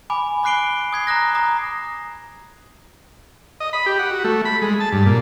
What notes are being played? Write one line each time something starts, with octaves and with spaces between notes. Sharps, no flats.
G#5 B5 D6
B5 D6 F#6 C7 D7 G7
D#6 G#6 C7
A#5 D#6 F#6 A#6
A#5 D#6
D#5
B5
G4
F#5
F#4
A3
B5
G#3
A5
G2
A#2